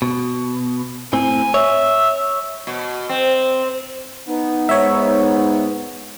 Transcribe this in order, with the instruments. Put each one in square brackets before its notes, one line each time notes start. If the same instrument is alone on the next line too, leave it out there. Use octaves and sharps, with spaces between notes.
[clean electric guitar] B2
[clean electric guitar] A2 C4 [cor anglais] G#5
[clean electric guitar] C#5 [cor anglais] E5
[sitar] B2
C4
[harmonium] B3 [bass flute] D#4
[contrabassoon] G#2 [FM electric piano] C#5 E5